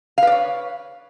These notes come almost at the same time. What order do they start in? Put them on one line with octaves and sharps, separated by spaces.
F5 B4 D5 C#5